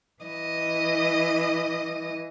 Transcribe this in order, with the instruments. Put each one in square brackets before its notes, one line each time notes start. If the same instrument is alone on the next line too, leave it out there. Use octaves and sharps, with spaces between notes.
[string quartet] E3 D#5